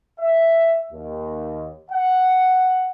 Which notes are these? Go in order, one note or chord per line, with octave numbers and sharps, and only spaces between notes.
E5
D#2
F#5